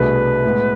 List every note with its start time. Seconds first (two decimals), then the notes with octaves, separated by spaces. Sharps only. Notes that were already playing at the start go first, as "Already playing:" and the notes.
Already playing: C2 B2 A3 D4 G#4 B4
0.44 A2 G#3 B3